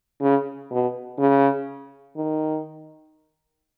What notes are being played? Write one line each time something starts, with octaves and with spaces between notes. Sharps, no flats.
C#3
B2
C#3
D#3